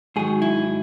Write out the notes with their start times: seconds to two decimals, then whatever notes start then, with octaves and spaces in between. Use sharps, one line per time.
0.16 G#2 D#3 F#3 G#4
0.42 E4